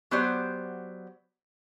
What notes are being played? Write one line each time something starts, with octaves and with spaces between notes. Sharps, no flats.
F#3 B3 G4 C5 D5